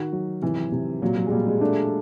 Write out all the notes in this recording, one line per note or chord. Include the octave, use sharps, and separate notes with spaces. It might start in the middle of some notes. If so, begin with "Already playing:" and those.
Already playing: D#3 F#4
F#3
C3 E3
C3
A#2 F#3
F#3
G#3
A#2 G3
G#3
A3 D4